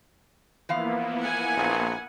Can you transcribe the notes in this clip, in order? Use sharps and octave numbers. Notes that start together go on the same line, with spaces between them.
E3 F3 A#3 B3 E4 F5
F#5 G#5
A#1